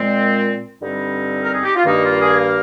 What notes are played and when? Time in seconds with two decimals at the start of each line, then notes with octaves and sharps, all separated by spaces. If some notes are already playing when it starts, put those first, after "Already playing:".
Already playing: A#2 G#3 C4
0.81 G2 D3 G3 C4 D#4
1.43 A#4
1.54 G#4
1.64 G4
1.76 F4
1.86 G2 D#3 A#3 D#4
2.04 F4
2.21 G#4
2.38 F5